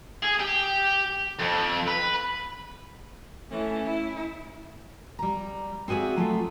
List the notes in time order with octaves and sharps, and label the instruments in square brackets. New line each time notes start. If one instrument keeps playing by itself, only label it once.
[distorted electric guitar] G#4
G4
F2
B4
[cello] E3 [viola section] A3 [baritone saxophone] C#4 [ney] E5
[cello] E4
[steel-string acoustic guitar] G3 A#5
C4 F#4 G#4 D5 E5
F#3 A3 F4